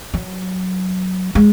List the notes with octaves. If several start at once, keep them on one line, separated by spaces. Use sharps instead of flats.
F#3
G#3